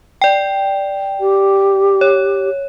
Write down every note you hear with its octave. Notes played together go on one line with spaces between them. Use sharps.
D5 G5
G4
C#5